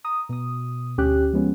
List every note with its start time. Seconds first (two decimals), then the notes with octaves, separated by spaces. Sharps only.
0.04 A#5 D#6
0.29 B2 D#6
0.98 D2 C#4 G4 F#6
1.33 F3 G#3 B3 C#4